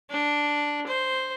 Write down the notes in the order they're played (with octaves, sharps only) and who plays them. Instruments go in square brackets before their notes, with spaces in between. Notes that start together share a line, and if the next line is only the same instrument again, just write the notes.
[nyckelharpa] D4
C5